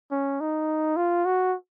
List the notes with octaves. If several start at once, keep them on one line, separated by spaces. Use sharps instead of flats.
C#4
D#4
F4
F#4